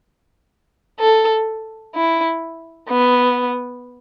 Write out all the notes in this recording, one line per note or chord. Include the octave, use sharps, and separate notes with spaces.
A4
E4
B3